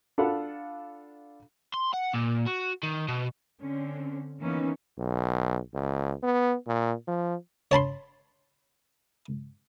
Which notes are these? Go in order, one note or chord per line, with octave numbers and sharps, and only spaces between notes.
D4 F4 A4 F5 F#5 B5
C6
F#5
A#2
F#4
D#3
B2
D3 C4 C#4
D#3 E3 A#3 B3 C#4 D#4
B1
C#2
B3
A#2
F3
C#5 A5 B5 C6